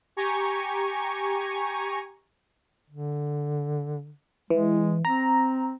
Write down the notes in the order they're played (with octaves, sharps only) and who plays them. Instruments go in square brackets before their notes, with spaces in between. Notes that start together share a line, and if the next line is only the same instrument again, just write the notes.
[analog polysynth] G4 G#5 A#5 C#6
[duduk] D3
[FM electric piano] E3 [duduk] G#3
[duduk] C4 [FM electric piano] A#5